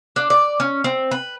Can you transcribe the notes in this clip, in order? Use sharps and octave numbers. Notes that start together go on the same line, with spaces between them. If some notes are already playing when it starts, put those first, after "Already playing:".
D4
D5
C#4
C4
B4